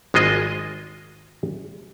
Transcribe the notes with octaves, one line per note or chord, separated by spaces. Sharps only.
G#1 G#3 F4 D#5